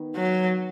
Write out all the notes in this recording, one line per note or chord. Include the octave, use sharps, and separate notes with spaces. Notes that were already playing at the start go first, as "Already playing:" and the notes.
Already playing: D#3 B3
F#3